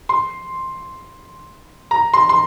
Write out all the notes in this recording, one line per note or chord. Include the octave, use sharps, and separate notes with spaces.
C6
A#5
C6
C6